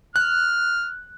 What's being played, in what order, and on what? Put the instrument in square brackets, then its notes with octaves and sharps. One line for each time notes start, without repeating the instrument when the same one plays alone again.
[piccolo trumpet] F6 [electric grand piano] F#6